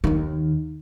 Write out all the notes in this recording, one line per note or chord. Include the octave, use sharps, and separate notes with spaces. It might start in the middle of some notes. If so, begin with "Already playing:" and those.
D#2 D#3